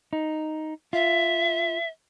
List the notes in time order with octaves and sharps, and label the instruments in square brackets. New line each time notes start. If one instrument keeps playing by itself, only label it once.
[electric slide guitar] D#4
[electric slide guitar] F4 [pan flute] E5